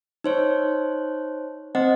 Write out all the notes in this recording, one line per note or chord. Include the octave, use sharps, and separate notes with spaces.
D#4 C5 C#5
C4 C5 D#5 F#5